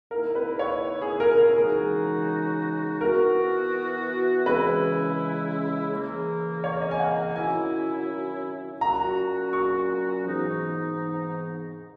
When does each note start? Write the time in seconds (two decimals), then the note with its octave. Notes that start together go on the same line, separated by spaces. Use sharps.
0.11 D#3 A#3 E4 A#4
0.35 B4
0.59 C#5
1.02 G#4
1.20 A#4
1.38 A#4
1.56 C#3 E3 G#3 D#4 F#4 G#4
3.01 E3 B3 F#4 A#4
4.46 C#3 E3 G#3 C#4 E4 B4
5.91 C#3 E3 A#3
6.64 C#5
6.81 D#5
6.91 G#5
7.00 F#5
7.36 D#3 F#3 C#4 E4 G#5
8.81 A#2 F#3 C#4 F#4 A#5
9.53 C#6
10.26 G#2 E3 B3 D#4